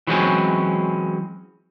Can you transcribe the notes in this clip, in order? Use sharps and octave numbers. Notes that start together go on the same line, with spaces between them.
E3 F#3 G#3 C4 C#4